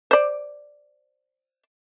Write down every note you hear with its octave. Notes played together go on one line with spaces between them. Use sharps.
C5 D5